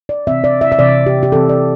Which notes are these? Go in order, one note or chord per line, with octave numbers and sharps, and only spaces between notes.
D5
C3 E3 C4 E5
D5
E5
E5
C3 E3 C4 D5
G4
G4
C3 E3 C4 A4
D5